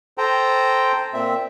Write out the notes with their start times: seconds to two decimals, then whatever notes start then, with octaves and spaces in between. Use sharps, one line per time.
0.18 A4 C5 G5 A#5
1.14 A#2 C4 E5